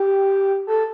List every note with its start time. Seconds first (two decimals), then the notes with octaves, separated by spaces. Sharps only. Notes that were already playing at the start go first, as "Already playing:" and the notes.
Already playing: G4
0.67 A4